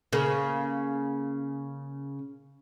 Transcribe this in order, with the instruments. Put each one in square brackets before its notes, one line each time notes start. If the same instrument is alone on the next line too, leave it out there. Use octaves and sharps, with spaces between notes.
[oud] C#3 A#3